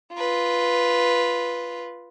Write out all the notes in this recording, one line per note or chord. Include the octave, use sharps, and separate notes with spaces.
F4 B4